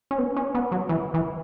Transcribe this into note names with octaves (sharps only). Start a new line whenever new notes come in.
C#4
B3
C#4
B3
F#3
E3
E3